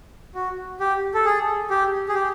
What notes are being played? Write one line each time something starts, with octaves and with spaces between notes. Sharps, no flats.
F#4
G4
A4
G#4
G4
G#4
G4